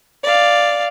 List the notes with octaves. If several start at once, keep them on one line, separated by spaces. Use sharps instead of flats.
D5 F5